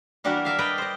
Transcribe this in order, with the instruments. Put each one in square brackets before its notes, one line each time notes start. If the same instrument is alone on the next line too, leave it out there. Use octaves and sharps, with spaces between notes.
[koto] E3 G3 A#3 D4 F#4 A#4
A#4 E5 F5
B4 D5 D#5 G5 A#5
C5 D#5